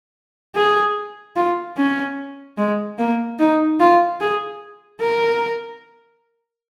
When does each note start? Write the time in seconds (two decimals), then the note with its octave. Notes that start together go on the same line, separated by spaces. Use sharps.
0.56 G#4
1.36 F4
1.77 C#4
2.58 G#3
2.99 A#3
3.39 D#4
3.80 F4
4.21 G#4
5.00 A#4